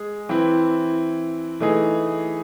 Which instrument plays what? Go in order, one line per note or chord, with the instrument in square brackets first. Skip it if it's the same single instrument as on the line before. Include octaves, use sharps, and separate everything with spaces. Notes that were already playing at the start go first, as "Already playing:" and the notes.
Already playing: [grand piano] G#3 G#4
E3 C4 E4
E3 A3 D#4 G#4